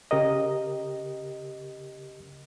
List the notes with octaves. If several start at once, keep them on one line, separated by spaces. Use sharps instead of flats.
C#3 G4 A#4 D#5